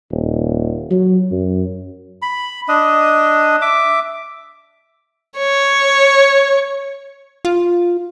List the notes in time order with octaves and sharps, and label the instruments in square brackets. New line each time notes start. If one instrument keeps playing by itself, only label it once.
[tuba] D#1
F#3
F#2
[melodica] B5
D4 D#5
E5 D6
[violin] C#5
[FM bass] F4